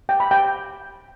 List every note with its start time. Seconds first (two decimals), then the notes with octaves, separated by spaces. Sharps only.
0.09 G5
0.20 B5
0.31 G5